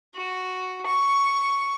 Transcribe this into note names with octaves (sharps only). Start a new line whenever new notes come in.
F#4
C#6